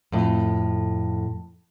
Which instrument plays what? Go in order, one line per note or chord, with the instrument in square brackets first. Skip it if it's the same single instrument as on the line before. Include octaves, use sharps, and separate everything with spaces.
[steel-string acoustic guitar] F2 A2